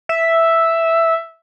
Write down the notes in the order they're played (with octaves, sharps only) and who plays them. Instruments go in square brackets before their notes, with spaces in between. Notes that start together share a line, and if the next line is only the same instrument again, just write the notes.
[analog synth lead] E5